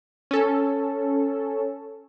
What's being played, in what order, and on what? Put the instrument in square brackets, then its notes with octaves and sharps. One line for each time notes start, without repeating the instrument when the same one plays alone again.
[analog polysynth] C#4 A4